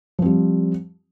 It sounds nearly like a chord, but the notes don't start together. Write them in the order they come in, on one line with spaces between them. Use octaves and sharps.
F3 C4 G3